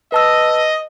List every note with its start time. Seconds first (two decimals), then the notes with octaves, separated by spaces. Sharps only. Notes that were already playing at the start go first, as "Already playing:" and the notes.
0.12 B4 D#5 A5 E6